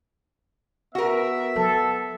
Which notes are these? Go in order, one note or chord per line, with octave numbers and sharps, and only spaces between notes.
B3 F#4 A#4 E5
F#3 A4